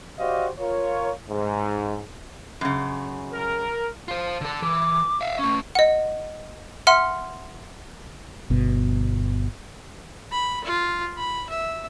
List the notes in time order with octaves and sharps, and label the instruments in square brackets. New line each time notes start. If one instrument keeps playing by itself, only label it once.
[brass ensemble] F#4 G4 C5 D5 D#5 F5
F4 A#4 C#5
G#2
[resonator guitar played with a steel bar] F#2 C#3
[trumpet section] A#4
[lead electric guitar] F4 C5
D3 A4
[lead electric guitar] E3 [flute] D6
[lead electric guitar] E5 F5
[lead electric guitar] A3 C#4 [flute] C#6
[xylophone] D#5 F#5
E5 F#5 C6 F6
[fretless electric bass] G1 B2
[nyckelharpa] B5
F4
B5
E5